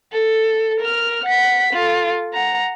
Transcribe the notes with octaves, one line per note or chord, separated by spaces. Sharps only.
A4
A#4 F6
F#5 B6
F4 A4
F#5 A#5